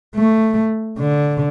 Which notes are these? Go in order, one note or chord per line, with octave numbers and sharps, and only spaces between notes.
A3
D3